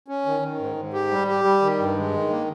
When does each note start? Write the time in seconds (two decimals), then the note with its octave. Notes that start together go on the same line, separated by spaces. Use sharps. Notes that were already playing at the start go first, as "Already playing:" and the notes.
0.08 C#4
0.26 D#3
0.43 D#3
0.59 G#2
0.76 G#2
0.93 G4
1.11 G3
1.28 G4
1.44 G3
1.62 D#3
1.79 G2
1.97 G#3
2.14 D#3
2.30 A#3